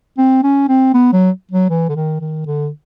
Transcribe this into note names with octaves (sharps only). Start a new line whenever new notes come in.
C4
C#4
C4
B3
F#3
F#3
E3
D3
D#3
D#3
D3